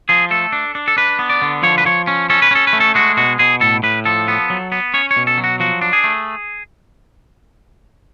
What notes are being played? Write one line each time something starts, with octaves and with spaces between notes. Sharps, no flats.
F3 G#4
A3 A4
D4
D4
A4
D4 B4
B3
D5
D3
F3 C#5
B4
F3 C#5
C#4
C#4 A4
B4
C#4 A4
B4
A3
A4
G#3 F#4
B2 F#4
B2 G#4
A2 A4
A2 B4
F3 A4
B3
F#3
B3
C#4 C#5
C#5
B2
A4
F#3
F#4
F3 F#4
D4
G#4
A3